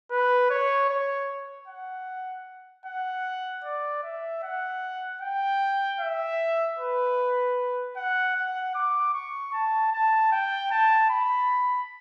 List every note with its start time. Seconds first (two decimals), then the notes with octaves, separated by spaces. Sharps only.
0.10 B4
0.50 C#5
0.90 C#5
1.68 F#5
2.86 F#5
3.64 D5
4.03 E5
4.43 F#5
5.21 G5
6.00 E5
6.79 B4
7.97 F#5
8.36 F#5
8.75 D6
9.14 C#6
9.53 A5
9.92 A5
10.32 G5
10.71 A5
11.10 B5